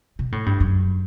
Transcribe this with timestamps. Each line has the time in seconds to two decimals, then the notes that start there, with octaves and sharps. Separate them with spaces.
0.19 B2
0.32 A2
0.46 G2
0.60 F#2